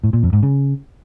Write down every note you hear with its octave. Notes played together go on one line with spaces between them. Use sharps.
A2
A#2
F2
G#2
C#3